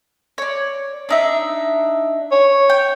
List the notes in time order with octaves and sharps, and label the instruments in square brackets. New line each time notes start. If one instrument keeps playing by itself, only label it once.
[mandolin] C#5 D5
D4 D#4 E5
[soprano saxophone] C#5
[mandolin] G5